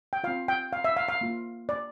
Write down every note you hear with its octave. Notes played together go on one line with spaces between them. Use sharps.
G5
C4 F4 F5
G5
F5
E5
F5
F5
A#3 F4
D5